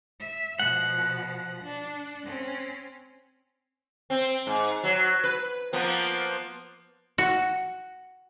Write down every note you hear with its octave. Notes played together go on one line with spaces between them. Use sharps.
E5
B2 F3 F#5
D4
C4 C#4
C4
G#2
F#3
B4
F3 A#3 B3
F#4